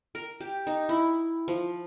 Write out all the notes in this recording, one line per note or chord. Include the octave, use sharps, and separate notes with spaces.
A#4
G4
D#4
E4
F3